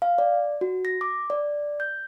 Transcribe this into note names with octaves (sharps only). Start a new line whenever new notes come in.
F5
D5
F#4
A#6
D6
D5
G6